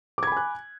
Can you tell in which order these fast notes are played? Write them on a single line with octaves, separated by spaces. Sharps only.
D6 G#6 B5 G#5 F#6